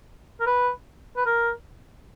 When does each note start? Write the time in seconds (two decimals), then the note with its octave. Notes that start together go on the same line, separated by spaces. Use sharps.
0.40 A#4
0.46 B4
1.17 B4
1.26 A#4